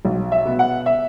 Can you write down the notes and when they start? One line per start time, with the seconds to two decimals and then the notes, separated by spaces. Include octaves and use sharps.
0.05 B1
0.32 E5
0.45 B2 B3
0.59 F#5
0.86 E5